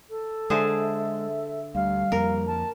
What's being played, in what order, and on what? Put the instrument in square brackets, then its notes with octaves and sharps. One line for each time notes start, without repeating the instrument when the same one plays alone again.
[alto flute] A4
[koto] D3 G#4 C5 [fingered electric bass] G#3 [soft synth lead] E5
[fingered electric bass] D2 [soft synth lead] G3 [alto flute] F5
[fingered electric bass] F2 F3 A#3 [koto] A#4
[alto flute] A5